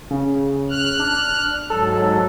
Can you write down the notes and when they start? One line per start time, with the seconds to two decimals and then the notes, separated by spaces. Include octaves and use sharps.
0.11 C#3
0.70 F6 F#6
0.99 D4
1.70 G#2 F#3 A4